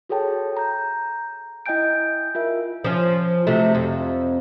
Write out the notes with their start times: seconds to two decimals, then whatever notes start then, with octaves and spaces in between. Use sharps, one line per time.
0.09 F#4 G#4 A4 C#5 G5 A5
0.57 A#5 G6
1.66 E4 D#5 G5 G#5 G6 D7
2.35 F4 A#4 E5
2.84 F3 C#4
3.47 C3 F#3 A3
3.75 F2